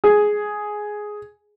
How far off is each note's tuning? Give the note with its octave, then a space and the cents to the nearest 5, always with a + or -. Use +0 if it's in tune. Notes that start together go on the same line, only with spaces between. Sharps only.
G#4 +5